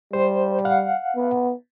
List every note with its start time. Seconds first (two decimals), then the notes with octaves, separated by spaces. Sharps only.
0.13 G3 C5
0.65 F5 F#5
1.16 B3